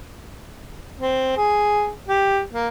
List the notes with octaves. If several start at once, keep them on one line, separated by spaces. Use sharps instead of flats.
C4
G#4
G4
A#3